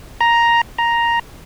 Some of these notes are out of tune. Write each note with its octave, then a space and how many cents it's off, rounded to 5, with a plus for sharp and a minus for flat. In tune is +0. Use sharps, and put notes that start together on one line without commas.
A#5 +5
A#5 +5